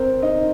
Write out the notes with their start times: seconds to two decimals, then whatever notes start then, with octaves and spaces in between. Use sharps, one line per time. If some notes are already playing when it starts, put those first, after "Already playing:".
Already playing: C4 A#4 C5
0.22 D#4 D#5